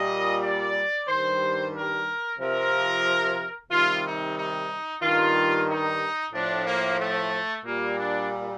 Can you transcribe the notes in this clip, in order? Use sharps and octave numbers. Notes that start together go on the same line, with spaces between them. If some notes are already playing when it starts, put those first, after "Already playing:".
Already playing: A#2 G3 D#5
D5
G2 D#3 G3 C5
A#4
C3 F3 A#4
C3 D#3 G3 F4
D#4
D#4
G2 D#3 G3 F4
D#4
A2 F3 D4
A#3
A3
A#2 G3 A#3
D4